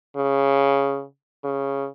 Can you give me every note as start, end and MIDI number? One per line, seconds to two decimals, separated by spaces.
0.16 1.03 49
1.44 1.87 49